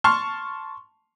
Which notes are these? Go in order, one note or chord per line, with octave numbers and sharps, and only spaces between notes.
A5 C6 C#6 F6